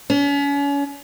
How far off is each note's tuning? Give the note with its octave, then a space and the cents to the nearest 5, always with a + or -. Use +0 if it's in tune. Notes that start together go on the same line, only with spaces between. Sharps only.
C#4 +40